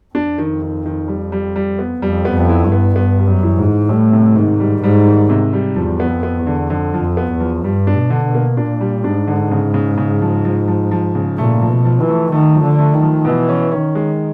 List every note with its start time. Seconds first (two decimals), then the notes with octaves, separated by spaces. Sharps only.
0.15 F2 D4
0.38 D#3
0.62 D#3
0.86 D#3
1.08 G3
1.32 G3
1.56 G3
1.79 B3
2.02 F2 G3
2.25 B3
2.33 F2
2.49 E4
2.65 G2
2.72 B3
2.95 G2 B3
3.19 G3
3.27 F#2
3.43 E3
3.58 G#2
3.66 E3
3.89 A2 G3
4.12 C3
4.36 G#2 D#3
4.60 G3
4.83 G#2 G3
5.06 D#3
5.30 C3
5.53 G3
5.76 E2 F3
6.00 B3
6.08 F2
6.23 B3
6.39 E2
6.47 D3
6.70 F2 D3
6.94 F3
7.01 F2
7.17 B3
7.32 E2
7.40 F3
7.64 G2 G3
7.87 D4
7.95 B2
8.10 D3
8.26 B2
8.35 A#3
8.57 A#2 D4
8.81 G3
9.04 G#2 D4
9.27 D3
9.51 C#3
9.74 C#3
9.98 C#3
10.22 F3
10.45 F3
10.68 F3
10.91 F3
11.15 C#3
11.38 A#2 A3
11.62 F3
11.69 B2
11.85 F3
12.01 E3
12.09 A3
12.32 D#3 A3
12.55 F3
12.63 D3
12.79 A3
12.94 D#3
13.02 F3
13.25 B2 E3
13.49 C#4
13.72 D#3 C#4
13.95 G#3